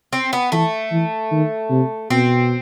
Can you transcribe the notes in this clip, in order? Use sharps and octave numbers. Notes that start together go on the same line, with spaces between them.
C4
B3
E3 A3
E3
D#3
C3
B2 C4